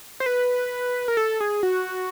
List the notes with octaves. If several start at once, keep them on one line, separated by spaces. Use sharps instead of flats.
C5
B4
A#4
A4
G#4
F#4